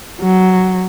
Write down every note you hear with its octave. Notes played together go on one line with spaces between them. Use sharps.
F#3